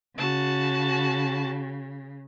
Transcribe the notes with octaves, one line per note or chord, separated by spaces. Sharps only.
C#3 F#4 A5